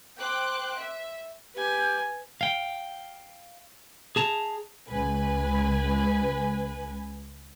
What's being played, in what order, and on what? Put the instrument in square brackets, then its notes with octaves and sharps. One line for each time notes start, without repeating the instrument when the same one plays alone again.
[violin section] C5 G5 D6 F#6
E5
[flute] G4 [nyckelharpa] B4 G#5
[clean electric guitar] F5 G5
G#4 A5 A#5
[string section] C#2 B4 G#5